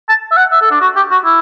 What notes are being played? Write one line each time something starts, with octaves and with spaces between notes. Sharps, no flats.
A5
E5
F#5
E5
A4
D4
F#4
G4
F#4
E4